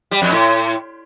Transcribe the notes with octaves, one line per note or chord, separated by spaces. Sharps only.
G3
F2
A2